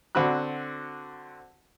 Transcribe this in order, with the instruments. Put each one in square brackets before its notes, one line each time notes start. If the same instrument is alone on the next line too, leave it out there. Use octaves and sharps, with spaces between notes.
[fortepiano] D3 C4 F#4 B5 F#6